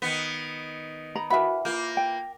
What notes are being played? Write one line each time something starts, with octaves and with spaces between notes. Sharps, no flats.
D#3 B3 B6 C#7
A#5 B5
E3 F#4 A#4 E5 F#5 B5
A#3 F4 A#4 G6
G5